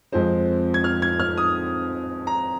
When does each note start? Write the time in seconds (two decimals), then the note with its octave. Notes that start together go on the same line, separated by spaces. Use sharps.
0.12 F2 F3 G#3 C4 C5
0.74 G#6
0.84 F6
1.02 G#6
1.20 F6
1.38 D#6
2.27 A#5